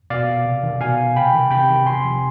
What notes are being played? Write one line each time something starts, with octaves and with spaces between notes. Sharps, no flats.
B2 D5 F5
C3
D#3
B2 F5 G#5
C3 G5 B5
D#3
C3 G5 B5
D#3
C3 G#5 C6
F3